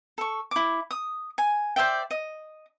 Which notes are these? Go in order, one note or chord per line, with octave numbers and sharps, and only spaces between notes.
A4 C#6
E4 D6
D#6
G#5
C5 D5 E5 G5
D#5